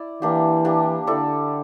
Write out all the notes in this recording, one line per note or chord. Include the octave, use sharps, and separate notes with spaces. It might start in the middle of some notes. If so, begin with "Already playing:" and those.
Already playing: E4 D5
E3 A#3 D4 G4
A#3 D4 G4
D3 E4 A4 D5